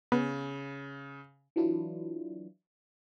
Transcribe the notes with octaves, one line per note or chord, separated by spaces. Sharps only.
C#3 B3
E3 F#3 D4 E4 F4